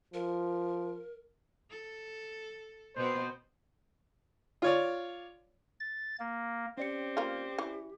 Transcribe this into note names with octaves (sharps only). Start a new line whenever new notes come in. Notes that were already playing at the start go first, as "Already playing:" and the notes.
F3 A#4
A4
B2 B3 C4 C5
F4 C#5 D5
A6
A#3
C4 C#4 G4 D5 C#7
A#3 F4
E3